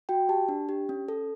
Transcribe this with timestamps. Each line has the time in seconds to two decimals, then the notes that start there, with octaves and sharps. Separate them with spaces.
0.09 F#4 G5
0.29 G4 A5
0.49 D4
0.69 G4
0.89 C#4
1.08 A4